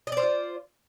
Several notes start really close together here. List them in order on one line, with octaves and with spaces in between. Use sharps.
D#5 D5 C5 F4